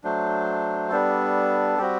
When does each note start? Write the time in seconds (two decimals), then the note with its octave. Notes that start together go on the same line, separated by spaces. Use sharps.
0.04 F#3 A3 D4 C5
0.91 G3 B3 D4 A4
1.78 G3 C4 F#4 G4